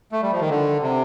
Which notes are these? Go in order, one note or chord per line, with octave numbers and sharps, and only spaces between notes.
A3
G3
F3
D#3
D3
C3